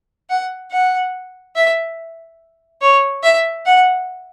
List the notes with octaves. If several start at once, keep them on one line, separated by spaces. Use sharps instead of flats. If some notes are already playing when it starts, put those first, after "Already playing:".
F#5
F#5
E5
C#5
E5
F#5